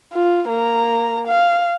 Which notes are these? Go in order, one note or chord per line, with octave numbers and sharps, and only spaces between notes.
F4
A#3 A#5
F5